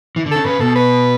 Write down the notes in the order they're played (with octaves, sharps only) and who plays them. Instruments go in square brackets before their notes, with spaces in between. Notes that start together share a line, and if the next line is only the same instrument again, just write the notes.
[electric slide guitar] E3
D3
[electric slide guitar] C#3 [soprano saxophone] A4
[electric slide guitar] C#3 [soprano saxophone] B4
[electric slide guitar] B2 [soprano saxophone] A4
[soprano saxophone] B4